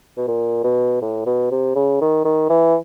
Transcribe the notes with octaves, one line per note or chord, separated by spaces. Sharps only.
B2
A#2
B2
A2
B2
C3
C#3
D#3
D#3
E3